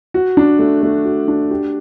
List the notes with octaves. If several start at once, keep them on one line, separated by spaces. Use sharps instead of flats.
F#4
D4
A3
A3
F#4
D4
G4